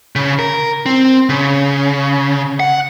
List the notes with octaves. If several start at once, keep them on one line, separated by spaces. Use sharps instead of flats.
C#3
A#4
C4
C#3
F#5